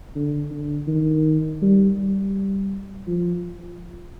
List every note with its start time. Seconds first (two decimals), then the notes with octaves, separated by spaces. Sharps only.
0.15 D3
0.51 D3
0.88 D#3
1.62 G3
1.98 G3
3.07 F3